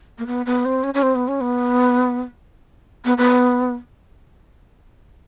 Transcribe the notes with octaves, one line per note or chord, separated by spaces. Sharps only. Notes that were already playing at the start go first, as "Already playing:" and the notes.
A#3
B3
B3
C4
C#4
C#4
C4
B3
C#4
B3
B3
B3